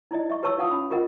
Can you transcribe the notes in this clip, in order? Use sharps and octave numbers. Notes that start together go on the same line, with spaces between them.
D#4 E4 D5 D#5
D#5 E5 C#6
G4 B4 C#5 A5 C#6 E6
D#4 F4 F5 F#5 A5 D#6
C#4 B5
F4 G4 A#4 D#5 F#5